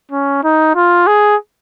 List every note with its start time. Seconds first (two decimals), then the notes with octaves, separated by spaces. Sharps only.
0.12 C#4
0.44 D#4
0.76 F4
1.07 G#4